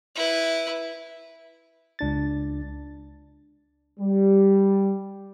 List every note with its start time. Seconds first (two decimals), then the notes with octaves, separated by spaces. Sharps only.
0.15 E4 B4
1.99 C#2 D4 A6
3.99 G3